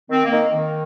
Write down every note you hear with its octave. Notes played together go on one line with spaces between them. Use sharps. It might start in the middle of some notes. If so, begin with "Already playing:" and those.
D#3 C4
A#3
D#3
D#3